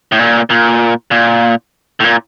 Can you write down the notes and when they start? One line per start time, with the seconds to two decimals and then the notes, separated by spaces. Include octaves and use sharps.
0.12 A2
0.19 A#2
0.50 A#2
1.11 A#2
2.00 A2
2.04 A#2